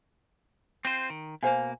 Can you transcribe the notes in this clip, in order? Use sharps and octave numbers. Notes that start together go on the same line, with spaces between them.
C4 F4 C5
D#3
B2 A#3 C5 F5 G#5